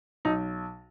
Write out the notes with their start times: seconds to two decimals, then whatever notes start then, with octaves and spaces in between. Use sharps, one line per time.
0.25 B1 D#4